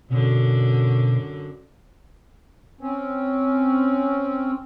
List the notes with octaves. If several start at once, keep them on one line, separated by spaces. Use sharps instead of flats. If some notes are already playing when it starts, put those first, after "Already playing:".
F#2 B2 D3 F#4
C4 C#4